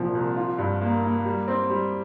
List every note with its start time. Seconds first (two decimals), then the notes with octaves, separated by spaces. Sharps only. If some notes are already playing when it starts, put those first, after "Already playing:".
Already playing: C2 A#2 F3
0.15 C2
0.36 F4
0.58 G2
0.81 A#3
1.03 A#3
1.25 G3
1.48 C4
1.70 G3